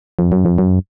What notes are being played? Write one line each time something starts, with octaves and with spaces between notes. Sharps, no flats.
F2
F#2
F2
F#2